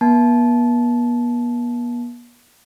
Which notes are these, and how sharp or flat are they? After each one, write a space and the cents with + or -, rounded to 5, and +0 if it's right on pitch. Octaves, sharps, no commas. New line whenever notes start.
B3 -45 A5 -20